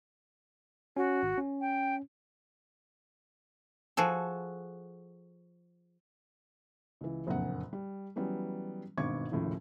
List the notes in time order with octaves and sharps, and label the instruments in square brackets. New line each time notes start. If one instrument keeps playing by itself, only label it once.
[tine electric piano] C#4 [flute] F#4
[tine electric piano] G#1
C#4
[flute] G5
[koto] F3 F#4 G#4 A4
[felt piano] C#2 E3
F#1 F2 A#2 D3 F#5
G3
E3 F#3 G3 B3 C#4
G#1 G2 B2 C#6 D6 G#6
F1 A#1 D#2 A2 C#3 F3